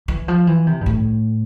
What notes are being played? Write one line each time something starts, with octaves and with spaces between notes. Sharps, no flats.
E3
F3
E3
C3
G2
A2